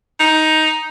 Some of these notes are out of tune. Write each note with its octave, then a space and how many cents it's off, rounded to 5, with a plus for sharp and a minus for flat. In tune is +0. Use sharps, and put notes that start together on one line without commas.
D#4 +10